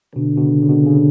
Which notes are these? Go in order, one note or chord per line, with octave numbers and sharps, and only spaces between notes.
B2 D3
B2
C#3
C#3
B2
C#3